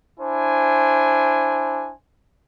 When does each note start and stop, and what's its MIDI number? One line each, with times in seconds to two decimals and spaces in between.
0.19 1.91 62
0.19 1.91 64
0.19 1.91 72
0.19 1.91 80